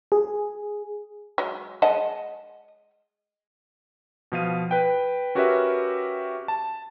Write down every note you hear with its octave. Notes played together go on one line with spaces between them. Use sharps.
G#4
F#3 G#3
G#3 D#5 F#5 A5
B2 F3 F5 D#7
B4 G5
C#4 F#4 G4 A#4 B4 E5
A5